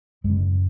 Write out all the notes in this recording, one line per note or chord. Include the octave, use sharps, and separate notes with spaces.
F#2 G#3
C#3